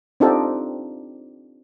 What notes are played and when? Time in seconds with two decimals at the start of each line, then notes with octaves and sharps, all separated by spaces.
0.20 C4 D4 D#4 F4 G4 A4